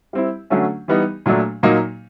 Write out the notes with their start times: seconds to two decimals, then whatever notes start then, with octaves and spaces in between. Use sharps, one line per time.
0.13 G3 C4 E4
0.50 D3 F#3 A3 C#4
0.88 E3 G3 B3 D#4
1.26 A#2 F#3 A3 D4
1.63 A#2 F#3 A#3 D#4